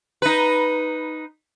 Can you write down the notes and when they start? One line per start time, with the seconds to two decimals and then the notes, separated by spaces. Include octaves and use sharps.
0.22 D#4 B4